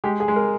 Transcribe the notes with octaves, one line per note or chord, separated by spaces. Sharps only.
G#3 G4
G#4
G#3
A#4